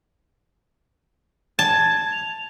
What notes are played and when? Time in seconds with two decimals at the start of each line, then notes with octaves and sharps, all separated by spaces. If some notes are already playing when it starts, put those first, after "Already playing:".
1.59 A5 G#6
2.12 F7